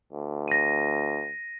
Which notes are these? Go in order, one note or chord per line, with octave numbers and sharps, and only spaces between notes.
D2
A#6 D#7